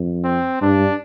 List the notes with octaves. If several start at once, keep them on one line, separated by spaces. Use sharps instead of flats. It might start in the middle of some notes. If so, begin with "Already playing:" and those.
Already playing: F2
C4
G2 D4